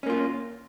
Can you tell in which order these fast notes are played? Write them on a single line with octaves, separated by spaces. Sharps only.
C#4 A#3 F4